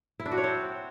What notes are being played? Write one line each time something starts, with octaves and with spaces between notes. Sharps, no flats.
E4
D4
F#4
C#5
C4